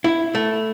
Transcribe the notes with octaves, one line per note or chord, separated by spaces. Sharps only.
E4
A3